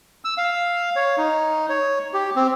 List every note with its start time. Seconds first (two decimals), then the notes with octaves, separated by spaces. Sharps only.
0.25 E6
0.38 F5
0.96 C#5
1.18 D#4
1.69 C#5
2.13 G4
2.36 C4